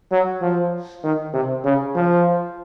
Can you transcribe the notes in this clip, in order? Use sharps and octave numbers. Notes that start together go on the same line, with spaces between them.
F#3
F3
D#3
C3
C#3
F3